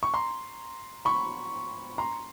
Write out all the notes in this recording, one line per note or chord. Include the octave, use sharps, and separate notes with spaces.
C#6
A#5 C6
B5 C#6
A#5 C6